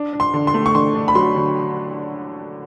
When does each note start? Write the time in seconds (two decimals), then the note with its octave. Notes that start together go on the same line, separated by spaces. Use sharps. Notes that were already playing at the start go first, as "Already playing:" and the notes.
Already playing: D4
0.13 D4
0.20 C6
0.34 D3
0.47 C6
0.54 A3
0.66 C#6
0.75 D3 C6
0.95 D4
1.08 B5
1.15 F#3 C6
1.36 D3